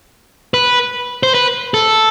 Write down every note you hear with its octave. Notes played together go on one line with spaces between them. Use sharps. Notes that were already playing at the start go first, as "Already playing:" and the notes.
B4
C5
B4
A4